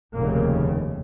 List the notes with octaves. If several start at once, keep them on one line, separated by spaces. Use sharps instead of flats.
F1 D#2 A#2 C#3 A#3